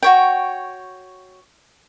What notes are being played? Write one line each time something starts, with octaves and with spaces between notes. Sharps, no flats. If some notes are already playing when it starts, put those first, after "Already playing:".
F#4 C#5 G5